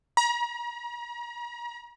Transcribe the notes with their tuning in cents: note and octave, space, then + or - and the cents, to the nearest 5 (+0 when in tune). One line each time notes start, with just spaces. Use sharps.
A#5 +40